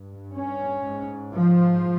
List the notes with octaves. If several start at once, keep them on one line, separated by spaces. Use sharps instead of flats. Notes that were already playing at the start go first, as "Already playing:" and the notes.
Already playing: G2
C#4
G#2
F3